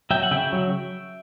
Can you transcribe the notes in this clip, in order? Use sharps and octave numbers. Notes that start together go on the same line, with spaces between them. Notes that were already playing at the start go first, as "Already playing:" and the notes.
F#3 E5 G5
F#5
C#3 E5 G5
F#3